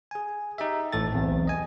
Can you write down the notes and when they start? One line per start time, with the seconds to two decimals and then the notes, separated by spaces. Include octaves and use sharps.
0.11 G#4 G#5
0.58 D#4 G4 E5
0.93 A1 A2 A4 A6
1.12 B1 E2 C4
1.47 D#5 G#5